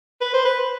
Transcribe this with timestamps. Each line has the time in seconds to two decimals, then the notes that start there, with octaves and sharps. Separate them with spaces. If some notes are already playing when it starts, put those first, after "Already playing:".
0.21 B4
0.33 C5
0.45 B4